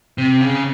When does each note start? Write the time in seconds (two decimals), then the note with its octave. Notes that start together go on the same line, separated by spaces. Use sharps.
0.18 C3
0.41 C#3